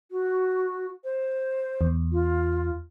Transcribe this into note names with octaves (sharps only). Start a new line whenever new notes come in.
F#4
C5
E2
F4